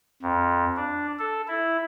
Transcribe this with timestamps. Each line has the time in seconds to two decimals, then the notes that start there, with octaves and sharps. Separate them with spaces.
0.22 F2
0.77 D4
1.18 A4
1.48 E4